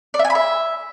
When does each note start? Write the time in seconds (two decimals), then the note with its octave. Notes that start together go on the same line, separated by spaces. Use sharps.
0.14 D5
0.19 E5
0.25 G#5
0.30 B5
0.35 E5